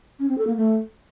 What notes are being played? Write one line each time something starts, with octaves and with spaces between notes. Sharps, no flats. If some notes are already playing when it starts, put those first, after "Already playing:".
C#4
C4
A4
A#3
A3